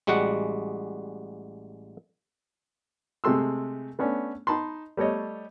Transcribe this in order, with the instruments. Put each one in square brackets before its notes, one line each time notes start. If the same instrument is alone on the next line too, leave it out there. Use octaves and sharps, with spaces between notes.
[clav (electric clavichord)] A1 G3 G#3 F#4 F#5
[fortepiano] C3 G#3 A3 C6 E6
A3 B3 C#4 D4
D#4 A5 B5 C6
G3 A3 C#5 D#5